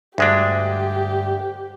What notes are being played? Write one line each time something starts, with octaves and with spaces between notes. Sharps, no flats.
D2 G2 G#3 D4 G4